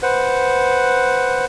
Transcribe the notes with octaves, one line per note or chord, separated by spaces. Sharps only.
B4 C5 F#5